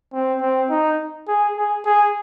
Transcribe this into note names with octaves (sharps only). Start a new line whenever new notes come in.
C4
C4
D#4
G#4
G#4
G#4